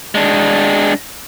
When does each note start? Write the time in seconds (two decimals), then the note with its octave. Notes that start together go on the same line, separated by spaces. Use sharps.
0.15 G#3 D4